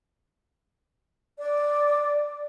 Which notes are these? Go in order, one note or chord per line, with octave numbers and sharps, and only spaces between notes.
D5